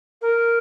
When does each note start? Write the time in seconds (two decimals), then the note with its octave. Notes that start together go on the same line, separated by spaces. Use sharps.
0.21 A#4